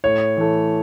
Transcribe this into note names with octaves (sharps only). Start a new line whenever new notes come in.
A2 C#5
E3 A3